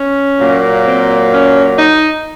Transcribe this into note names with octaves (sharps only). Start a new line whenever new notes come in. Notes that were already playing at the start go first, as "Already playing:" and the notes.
Already playing: C#4
A#2 F#3 A#3
C4
C#4
D#4